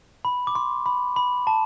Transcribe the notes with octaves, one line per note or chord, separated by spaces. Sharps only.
B5
D6
C6
B5
B5
A5